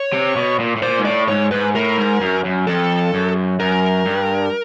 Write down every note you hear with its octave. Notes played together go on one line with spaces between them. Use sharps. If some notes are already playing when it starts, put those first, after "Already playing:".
Already playing: C#5
C3
B2
A#2
A2
A#2 C5
G#2
A2 D5
G#2 C#5
G#2 B4
A2 A#4
G#2
F#2
F#2
F2 A4
F#2
F#2 A#4
G2